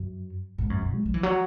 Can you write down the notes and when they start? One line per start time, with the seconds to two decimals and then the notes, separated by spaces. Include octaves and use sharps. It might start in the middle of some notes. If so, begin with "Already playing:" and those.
Already playing: F#2
0.58 G#2
0.70 F#2
0.82 A#2
0.94 G#3
1.06 F#3
1.14 E3
1.23 F#3